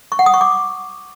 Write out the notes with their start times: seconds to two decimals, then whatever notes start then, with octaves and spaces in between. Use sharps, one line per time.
0.12 C#6
0.19 F#5
0.26 D#6
0.34 C#6
0.41 D6